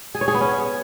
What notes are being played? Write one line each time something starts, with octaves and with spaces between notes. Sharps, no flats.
G#4
C#5
G#4
B3
C#4